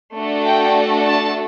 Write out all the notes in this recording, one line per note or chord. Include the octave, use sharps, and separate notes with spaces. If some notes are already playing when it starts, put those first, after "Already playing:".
A3 D4 F#4 A4
G5
A5